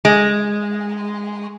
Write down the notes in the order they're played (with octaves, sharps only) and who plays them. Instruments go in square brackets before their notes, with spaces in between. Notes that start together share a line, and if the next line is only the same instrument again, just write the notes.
[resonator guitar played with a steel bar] G#3